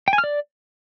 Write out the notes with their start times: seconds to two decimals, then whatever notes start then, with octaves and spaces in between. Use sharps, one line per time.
0.08 G5
0.13 G#5
0.18 F6
0.24 D5